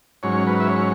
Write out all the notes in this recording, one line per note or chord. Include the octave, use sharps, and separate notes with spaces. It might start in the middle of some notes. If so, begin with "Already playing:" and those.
G#2 F#3 C#4 C#5
B4
E5
C#5